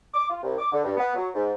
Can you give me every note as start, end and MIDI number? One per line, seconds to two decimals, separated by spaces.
0.14 0.29 86
0.30 0.40 65
0.43 0.59 36
0.59 0.71 86
0.72 0.83 50
0.84 0.96 43
0.97 1.13 59
1.15 1.28 54
1.35 1.53 44